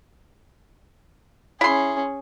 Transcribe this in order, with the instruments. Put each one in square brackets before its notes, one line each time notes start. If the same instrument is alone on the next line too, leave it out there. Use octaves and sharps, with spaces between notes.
[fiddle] C#4 G#4 [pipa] E4 C6